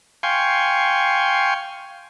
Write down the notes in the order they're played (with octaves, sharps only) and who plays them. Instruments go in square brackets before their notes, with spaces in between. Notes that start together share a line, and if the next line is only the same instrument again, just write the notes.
[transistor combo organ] F5 G5 G#5 C6 C#6